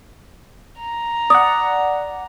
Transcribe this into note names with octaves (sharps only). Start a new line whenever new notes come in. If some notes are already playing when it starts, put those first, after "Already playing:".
A#5
D5 F#5 D#6